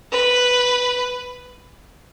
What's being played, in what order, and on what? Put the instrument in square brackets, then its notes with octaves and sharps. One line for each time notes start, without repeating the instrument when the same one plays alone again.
[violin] B4